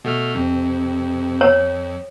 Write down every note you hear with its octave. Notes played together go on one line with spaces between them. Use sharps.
B2 A3 F6
F2 C3
C#5